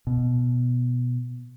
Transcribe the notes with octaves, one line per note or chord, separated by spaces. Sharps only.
B2